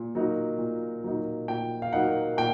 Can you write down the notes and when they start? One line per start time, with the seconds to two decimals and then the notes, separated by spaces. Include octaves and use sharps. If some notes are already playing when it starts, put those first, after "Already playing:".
Already playing: A#2
0.15 F#3 A#3 D#4
0.58 A#2
1.04 F#3 A#3 D#4
1.48 A#2 G5
1.82 F5
1.92 F#3 A#3 D#4 F#5
2.37 A#2 G5